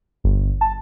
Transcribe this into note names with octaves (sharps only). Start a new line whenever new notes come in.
G1
A5